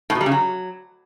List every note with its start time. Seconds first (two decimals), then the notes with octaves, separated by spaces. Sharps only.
0.10 A2
0.15 B2
0.21 G3
0.26 C#3
0.32 F#3